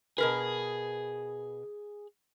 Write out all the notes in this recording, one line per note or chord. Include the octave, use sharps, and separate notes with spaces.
B2 G#4 A#4 B4